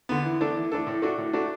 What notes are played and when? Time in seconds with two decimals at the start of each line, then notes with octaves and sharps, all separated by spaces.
0.09 D3 B3
0.25 E3
0.41 A3 D4 A4
0.56 E3
0.72 A3 D4 A4
0.87 A2
1.02 A3 D4 F#4
1.18 A2
1.33 A3 D4 F#4